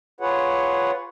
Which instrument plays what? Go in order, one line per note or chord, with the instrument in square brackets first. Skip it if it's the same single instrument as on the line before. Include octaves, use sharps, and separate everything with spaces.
[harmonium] F4 G#4 B4 C#5 F#5